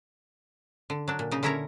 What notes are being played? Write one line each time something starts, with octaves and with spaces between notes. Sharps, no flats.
D3
F#3 D4
A#2
C#3 D#4
D3 C#4 E4 A#4 C#5 A#5